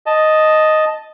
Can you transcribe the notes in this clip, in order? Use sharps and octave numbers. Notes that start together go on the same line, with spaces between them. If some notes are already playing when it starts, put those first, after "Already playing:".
D#5 A5